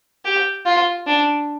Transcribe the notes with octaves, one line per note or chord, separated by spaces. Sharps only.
G4
F4
D4